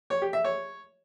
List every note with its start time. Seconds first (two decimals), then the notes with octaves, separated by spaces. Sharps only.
0.10 C#5
0.22 G4
0.33 E5
0.44 C#5